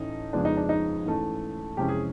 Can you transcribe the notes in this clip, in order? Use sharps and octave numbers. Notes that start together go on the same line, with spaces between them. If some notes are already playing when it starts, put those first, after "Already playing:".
Already playing: A2 E3 A3 C#4 D#4
F2 C#3 F3 G#3 B3 D4
D#4
D4
D#4
G#2 E3 A3 C#4
F2 C3 E3 G#3 C#4 G4
G#4